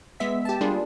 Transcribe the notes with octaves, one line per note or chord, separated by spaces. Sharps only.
G#3 B3 E5 B6
G4 A5
G3 A#3 D4 F4 G#4